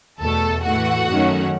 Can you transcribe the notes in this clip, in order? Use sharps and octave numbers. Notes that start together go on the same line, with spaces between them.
E2 B2 A3 A4 A5
A2 E3 A3 F#4 F#5
F#2 D#3 A3 C#4